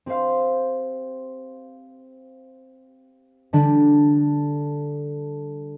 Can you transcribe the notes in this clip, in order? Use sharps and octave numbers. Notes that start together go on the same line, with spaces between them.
C4 G4 C5 F5
D3 G3 D4